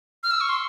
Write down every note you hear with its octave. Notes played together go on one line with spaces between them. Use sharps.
F6
E6
C#6
C6